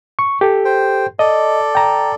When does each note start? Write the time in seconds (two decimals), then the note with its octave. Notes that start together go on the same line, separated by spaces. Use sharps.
0.19 C#6
0.41 G4 A4
0.65 C5 G5
1.19 A4 D5 D#5
1.75 G5 A#5